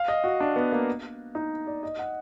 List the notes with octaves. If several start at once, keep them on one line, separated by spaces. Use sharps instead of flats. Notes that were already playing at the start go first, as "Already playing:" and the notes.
Already playing: F5
D#5
F#4
D4
B3
A#3
D#4
D5
D#5
F#5